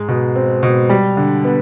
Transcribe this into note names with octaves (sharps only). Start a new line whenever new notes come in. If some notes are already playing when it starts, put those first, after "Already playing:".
Already playing: G#2 G#3
B2
C4
B2
G3
D3
B3